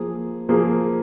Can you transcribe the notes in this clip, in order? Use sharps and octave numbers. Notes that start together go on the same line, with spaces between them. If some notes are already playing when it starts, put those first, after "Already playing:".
Already playing: F3 A#3 G#4
F3 A#3 G#4